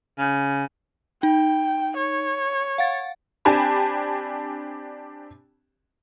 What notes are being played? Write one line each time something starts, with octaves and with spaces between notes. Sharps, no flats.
C#3
D#4 G5
C#5
F5 F#5 A6
C4 D4 G4 G#5 A5 B5